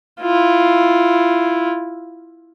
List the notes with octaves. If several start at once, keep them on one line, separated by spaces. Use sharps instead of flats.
E4 F4